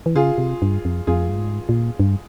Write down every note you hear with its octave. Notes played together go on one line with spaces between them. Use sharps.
E3
C#3 F4 G#4
C3
G2
F2
F2 F4 G#4
G2
G#2
A#2
G2